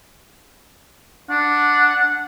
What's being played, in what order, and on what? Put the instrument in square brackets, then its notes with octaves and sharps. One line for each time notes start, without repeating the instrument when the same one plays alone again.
[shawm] D4 [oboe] F#5